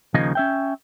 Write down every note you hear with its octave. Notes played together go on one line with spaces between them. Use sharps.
D#2 C#3 F3 A#3 D#4 D#5
C#4 E5 G5